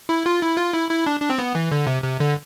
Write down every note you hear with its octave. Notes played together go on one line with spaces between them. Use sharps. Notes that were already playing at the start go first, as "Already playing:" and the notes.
E4
F4
E4
F4
E4
E4
D4
D4
C4
B3
E3
D3
C3
C3
D3